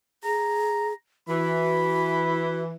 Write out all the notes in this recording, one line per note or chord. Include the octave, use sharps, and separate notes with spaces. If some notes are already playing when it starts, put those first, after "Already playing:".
G#4 A#5
E3 F#4 B5